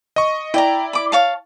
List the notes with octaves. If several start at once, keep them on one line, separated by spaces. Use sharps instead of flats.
D#5 C#6
E4 D5 G5 A#5
B5 D6
C#5 F5 A5